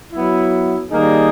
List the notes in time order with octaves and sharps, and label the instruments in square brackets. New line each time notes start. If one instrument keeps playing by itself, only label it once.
[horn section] F#3 B3 E4
D#3 G3 A#3 D#4 G#4